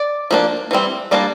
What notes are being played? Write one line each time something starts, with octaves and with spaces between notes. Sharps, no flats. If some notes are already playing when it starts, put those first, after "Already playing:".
Already playing: D5
F3 A#3 D4
E3 G3 C4
G3 A#3 D4 D5